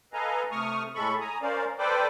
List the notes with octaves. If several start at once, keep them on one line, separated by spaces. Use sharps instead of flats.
A4 B4 D#5 F5 G#5 A#5
C3 A3 C#6 D#6 F6
A2 G#3 A4 B5 C#6
G#5 A#5 D#6
C#4 A#4 C5 D5 F5
A4 B4 C5 D5 G5 D6